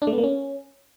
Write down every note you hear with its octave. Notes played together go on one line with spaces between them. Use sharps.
D4
A3
B3
A#3
C#4